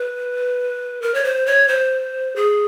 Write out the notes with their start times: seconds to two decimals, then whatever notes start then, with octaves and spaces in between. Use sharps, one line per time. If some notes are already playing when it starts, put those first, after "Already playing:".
Already playing: B4
1.02 A#4
1.14 C#5
1.24 C5
1.46 C#5
1.68 C5
2.36 G#4